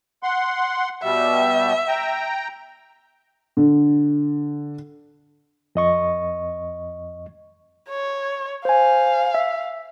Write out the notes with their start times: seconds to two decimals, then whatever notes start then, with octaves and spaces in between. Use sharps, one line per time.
0.23 F#5 C6
1.03 B2 G3 E5
1.88 G5 A#5
3.57 D3
5.75 F2 D#5 C#6
7.89 C#5
8.65 C5 F5 G#5
9.34 E5